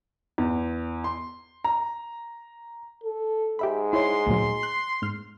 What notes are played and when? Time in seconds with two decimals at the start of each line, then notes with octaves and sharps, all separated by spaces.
0.38 E2
1.04 C6
1.64 A#5
3.04 A4
3.59 G#2 G4 E5 B5
3.93 E4 C#5 C6
4.26 D2 A#2 F#3
4.63 F#6
5.02 G#2 F6